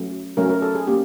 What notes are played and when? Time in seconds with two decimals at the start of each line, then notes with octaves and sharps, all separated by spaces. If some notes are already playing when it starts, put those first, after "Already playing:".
Already playing: F#3 A3 C#4
0.37 F#3 A3 C#4 A#4
0.50 A#4
0.62 A4
0.75 G#4
0.87 A#3 C#4 G4